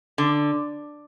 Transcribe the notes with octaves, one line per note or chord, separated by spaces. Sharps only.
D3